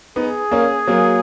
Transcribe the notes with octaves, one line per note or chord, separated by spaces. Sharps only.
B3 D#4 G#4
A#3 C#4
F#3 A#3